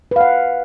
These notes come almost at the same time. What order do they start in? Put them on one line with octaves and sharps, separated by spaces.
B4 F5 F#5